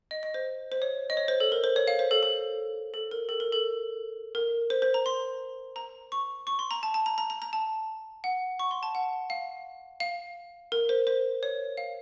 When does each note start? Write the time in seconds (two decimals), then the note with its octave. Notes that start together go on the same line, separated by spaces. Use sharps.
0.11 D#5
0.23 D#5
0.34 C5
0.72 C5
0.82 C#5
1.10 D#5
1.17 C#5
1.28 C5
1.40 A4
1.52 A#4
1.64 C5
1.76 C#5
1.87 F5
1.99 C5
2.11 A4
2.23 A4
2.94 A4
3.11 A#4
3.29 A4
3.40 A#4
3.52 A4
4.35 A#4
4.70 C5
4.82 C5
4.94 A#5
5.06 C6
5.76 A#5
6.12 C#6
6.47 C#6
6.59 C6
6.71 A#5
6.83 A5
6.94 A5
7.06 A#5
7.18 A#5
7.30 A#5
7.42 A#5
7.53 A5
8.24 F#5
8.59 C#6
8.71 C6
8.83 A5
8.95 F#5
9.30 F5
10.00 F5
10.72 A#4
10.89 C5
11.07 C5
11.43 C#5
11.77 F5